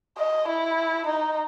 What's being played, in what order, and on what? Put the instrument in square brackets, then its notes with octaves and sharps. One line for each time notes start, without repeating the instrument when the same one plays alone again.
[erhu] D#5
E4
D#4